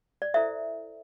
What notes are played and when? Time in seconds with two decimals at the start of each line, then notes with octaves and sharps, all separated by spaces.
0.22 D5
0.34 E4 A4 C5 E5